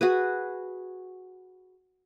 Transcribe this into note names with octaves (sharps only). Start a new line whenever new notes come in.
F#4 G#4 B4